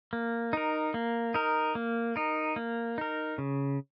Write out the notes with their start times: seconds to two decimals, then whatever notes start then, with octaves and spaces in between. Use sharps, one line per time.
0.13 A#3
0.53 D#4 A#4
0.94 A#3
1.34 D#4 A#4
1.75 A#3
2.16 D#4 A#4
2.56 A#3
2.98 D#4 A#4
3.38 C#3